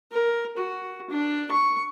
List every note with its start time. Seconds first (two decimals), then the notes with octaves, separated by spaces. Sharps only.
0.12 A#4
0.57 F#4
1.10 D4
1.52 C#6